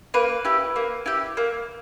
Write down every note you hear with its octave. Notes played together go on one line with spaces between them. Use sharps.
A#3 B4
E4 G4
A#3
E4 G4
A#3